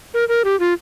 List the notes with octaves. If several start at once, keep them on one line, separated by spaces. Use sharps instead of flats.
A#4
A#4
G4
F4